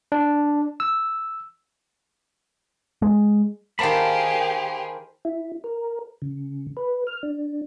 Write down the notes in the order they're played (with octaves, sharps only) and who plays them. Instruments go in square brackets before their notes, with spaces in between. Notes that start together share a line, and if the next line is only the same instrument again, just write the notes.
[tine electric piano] D4
E6
[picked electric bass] G#3
[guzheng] D#3 A#3 [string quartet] G4 G#4 [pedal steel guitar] C5 A5 B5
[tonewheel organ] E4
A#4
C#3
B4
F6
D4